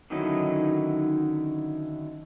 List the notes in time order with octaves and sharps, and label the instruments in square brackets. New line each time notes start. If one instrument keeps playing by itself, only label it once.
[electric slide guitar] D3 D#3 F#3 C#4 D#4 E4